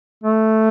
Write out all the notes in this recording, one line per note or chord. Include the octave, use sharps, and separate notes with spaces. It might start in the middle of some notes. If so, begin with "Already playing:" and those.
A3